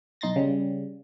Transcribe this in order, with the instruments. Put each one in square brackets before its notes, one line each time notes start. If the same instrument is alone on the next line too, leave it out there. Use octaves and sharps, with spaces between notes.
[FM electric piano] B1 D#4 C6 A6 A#6
C#3 G3